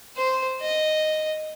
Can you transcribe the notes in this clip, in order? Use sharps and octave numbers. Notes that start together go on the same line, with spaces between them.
C5
D#5